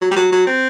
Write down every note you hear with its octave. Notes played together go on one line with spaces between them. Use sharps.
F#3
G3
F#3
F#3
C4